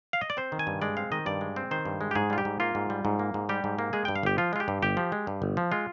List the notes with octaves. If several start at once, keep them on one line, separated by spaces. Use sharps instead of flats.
F5
D#5
D5
C4 C5
D#3
G#5
G2
G#3 D5
C4 F5
D#3 D#5
G2 D5
G#3
C4
D#3 C5
G2
G#3
G4
G#2 G#4
G3 F4
G4
G#2
A#3 F4
G#2
G3
G#2
A#3
G#2
G3 G4
G#2
A#3
G#3 G#4
G2 G5
F5
G1 G4
F3 F4
G#3 F4
G4
G2
G1 G4
F3
G#3
G2
G1
F3
G#3 F4